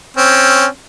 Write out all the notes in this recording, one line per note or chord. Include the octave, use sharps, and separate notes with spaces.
C4 C#4